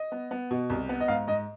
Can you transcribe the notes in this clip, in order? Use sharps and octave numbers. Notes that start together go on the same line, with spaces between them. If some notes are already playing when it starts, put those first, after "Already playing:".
Already playing: D#5
B3
B3
B2
C2
B3
D#5
G#2 F5
G#2 D#5